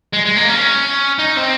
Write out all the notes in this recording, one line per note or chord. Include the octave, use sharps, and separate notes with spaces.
G#3
G#3
A#3
C#4
D#4
C4